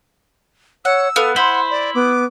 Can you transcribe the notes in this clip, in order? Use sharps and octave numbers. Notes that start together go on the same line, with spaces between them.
C#5 F#5 E6
B3 A4 F5
E4 C5 F#5 C6
D5
B3 D6